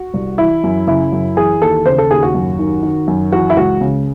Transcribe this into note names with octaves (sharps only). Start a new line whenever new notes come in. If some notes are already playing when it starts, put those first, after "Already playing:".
Already playing: F#4
C2
E3 E4
F#2
C#3 E4
F#2
E3 G#4
D#2 A4
C#3 C5
A4
D#2 G#4
F#4
F#2
D#3
D#3
F#2
E3 F#4
E4
C#2 F#4
C#3